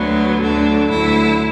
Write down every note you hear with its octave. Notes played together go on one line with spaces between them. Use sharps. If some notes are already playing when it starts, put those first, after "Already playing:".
Already playing: D2 D3 F#3 B3
D2 D3 F#3 D4
D2 D3 F#3 E4